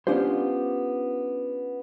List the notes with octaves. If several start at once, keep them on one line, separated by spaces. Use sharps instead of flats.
B3 C#4 D4 F4 G4 C5